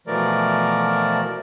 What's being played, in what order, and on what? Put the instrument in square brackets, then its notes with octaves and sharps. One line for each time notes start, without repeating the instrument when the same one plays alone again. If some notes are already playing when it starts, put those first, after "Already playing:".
[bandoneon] B2 E3 F3 A3 A#4 D5